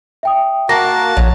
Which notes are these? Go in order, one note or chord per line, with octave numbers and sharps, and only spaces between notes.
E5 G5 D#6
A#3 F#4 F#5 A5 A#6
A#1 F#3